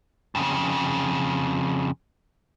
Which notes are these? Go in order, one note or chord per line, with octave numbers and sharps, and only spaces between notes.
F2 C#3